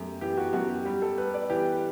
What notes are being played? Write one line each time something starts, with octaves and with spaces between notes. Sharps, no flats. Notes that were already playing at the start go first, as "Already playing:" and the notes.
Already playing: F#2 A3 G4
E3 G4
F#4
F#2 F#4
G4
G3 G4
A4
G3 B4
D5
E3 G4